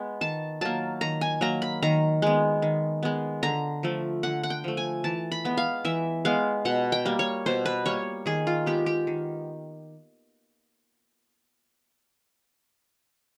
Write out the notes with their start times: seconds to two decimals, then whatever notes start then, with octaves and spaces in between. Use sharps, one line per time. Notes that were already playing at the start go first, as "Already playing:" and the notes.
Already playing: G#3 B3
0.21 D#3 A5
0.61 F#3 A#3 A5
1.01 D#3 A#5
1.21 G#5
1.41 F#3 A#3 A#5
1.62 B5
1.82 D#3 A#5
2.22 G#3 B3
2.62 D#3
3.03 G#3 B3
3.43 D3 A#5
3.83 F3 A3
4.23 D3 F#5
4.43 F#5
4.50 G5
4.64 F3 A3
4.77 G#5
5.04 E3 A5
5.32 B5
5.45 G#3 B3
5.57 F5
5.85 E3 E5
6.25 G#3 B3 F5
6.65 B2 F#5
6.92 G5
7.05 G3 A#3
7.19 C#5
7.46 B2 C5
7.66 B4
7.86 G3 A#3 C#5
8.26 D#3 G#4
8.47 F4
8.66 G#3 B3 G4
8.86 G4
9.07 D#3